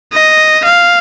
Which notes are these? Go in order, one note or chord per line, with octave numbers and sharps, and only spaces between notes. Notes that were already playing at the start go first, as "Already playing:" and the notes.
D#5
F5